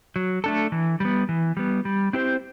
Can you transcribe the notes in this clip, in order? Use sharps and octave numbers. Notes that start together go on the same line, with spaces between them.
F#3
A3 D4 A4
E3
G3 B3
E3
G3 B3
G3
C4 E4 G4 C5